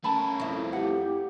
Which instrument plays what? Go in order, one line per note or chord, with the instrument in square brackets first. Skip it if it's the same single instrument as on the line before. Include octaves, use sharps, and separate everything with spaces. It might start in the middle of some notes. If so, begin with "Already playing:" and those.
[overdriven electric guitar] A3 A#4 [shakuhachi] C#4 [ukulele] A5 B5
[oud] F2 E4
[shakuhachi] G4 [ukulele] F#5